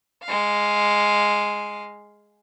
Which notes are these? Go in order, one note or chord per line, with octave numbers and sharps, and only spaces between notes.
G#3 F5